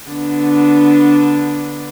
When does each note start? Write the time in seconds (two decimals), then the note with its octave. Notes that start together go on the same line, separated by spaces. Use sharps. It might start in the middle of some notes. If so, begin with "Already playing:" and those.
0.10 D3 B3 D4